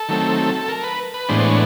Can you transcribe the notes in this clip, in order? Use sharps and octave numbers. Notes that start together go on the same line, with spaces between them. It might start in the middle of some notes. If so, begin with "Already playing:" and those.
Already playing: A4
D#3 F#3 A3 C4
A#4
B4
B4
A2 E3 G#3 B3 D4 C5
C#5